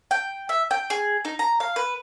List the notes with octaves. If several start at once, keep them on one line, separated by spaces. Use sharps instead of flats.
G5
E5
G5
G#4
D#4
A#5
F5
B4